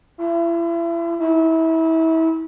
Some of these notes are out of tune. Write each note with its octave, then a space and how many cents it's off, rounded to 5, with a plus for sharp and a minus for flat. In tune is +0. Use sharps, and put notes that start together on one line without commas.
E4 +35
E4 -30